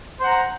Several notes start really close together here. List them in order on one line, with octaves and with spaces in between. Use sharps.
C5 F#5 A#5